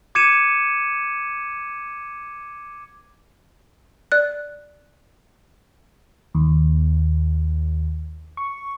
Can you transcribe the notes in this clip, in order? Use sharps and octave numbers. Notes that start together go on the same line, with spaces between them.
D6 G#6 C#7 D#7 E7
D5 F#6
D#2
C#6